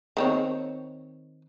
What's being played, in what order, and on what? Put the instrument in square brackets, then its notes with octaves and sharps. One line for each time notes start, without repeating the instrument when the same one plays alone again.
[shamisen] D#3 C4 C#5